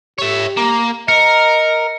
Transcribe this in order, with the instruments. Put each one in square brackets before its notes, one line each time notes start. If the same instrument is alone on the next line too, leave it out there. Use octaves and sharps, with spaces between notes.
[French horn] G4 [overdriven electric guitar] C#5 E5
[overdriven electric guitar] A#3
[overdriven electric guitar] A#4 [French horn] D#5 [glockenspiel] C#7